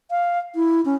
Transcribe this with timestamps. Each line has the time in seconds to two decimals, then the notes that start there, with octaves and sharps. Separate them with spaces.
0.11 F5
0.55 E4
0.85 C#4